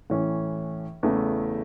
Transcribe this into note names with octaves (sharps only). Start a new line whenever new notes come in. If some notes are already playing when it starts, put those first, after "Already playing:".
A2 E3 C#4
E2 C#3 A3 E4